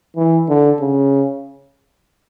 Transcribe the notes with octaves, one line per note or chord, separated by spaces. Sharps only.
E3
D3
C#3